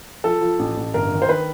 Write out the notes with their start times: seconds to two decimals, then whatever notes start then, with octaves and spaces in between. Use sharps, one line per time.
0.24 F3 A4
0.41 F3
0.59 A1
0.77 A1
0.94 G1 A#4
1.12 D#3
1.22 C5
1.29 D#3 B4